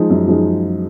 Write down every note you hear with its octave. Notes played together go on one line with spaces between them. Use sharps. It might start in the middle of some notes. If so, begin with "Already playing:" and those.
Already playing: F3 G#3 D#4
F#2
F3 G#3 D#4